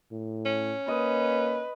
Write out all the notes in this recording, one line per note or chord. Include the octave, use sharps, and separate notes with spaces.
A2
C#4
A#3 B4 D#5